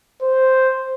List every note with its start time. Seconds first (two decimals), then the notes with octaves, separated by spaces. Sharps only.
0.22 C5